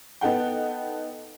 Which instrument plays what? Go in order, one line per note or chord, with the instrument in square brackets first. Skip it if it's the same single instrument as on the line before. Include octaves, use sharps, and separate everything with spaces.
[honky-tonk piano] B3 D#4 A4 F#5 G5